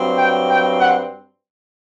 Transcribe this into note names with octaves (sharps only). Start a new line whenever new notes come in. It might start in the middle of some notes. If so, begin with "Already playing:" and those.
Already playing: G2 F#3 C4
G5
G5
F#5